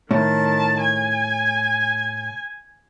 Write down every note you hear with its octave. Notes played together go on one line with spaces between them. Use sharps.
A2 D#3 A5
G#5